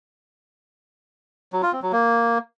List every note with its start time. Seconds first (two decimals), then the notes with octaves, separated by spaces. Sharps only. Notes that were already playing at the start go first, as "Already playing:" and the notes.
1.53 F#3
1.62 F4
1.72 C4
1.82 F#3
1.92 A#3